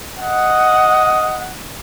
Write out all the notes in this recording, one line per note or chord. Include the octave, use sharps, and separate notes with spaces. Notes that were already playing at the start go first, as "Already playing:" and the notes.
D#5 F#5